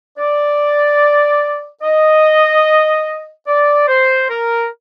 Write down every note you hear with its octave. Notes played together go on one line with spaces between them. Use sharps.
D5
D#5
D5
C5
A#4